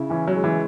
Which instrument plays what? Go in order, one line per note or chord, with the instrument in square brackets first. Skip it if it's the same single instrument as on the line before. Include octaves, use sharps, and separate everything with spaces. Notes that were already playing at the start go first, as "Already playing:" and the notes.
Already playing: [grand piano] C#3 E4
[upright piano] E3 [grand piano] C#4
[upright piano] F#3
[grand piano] G#3
[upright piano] E3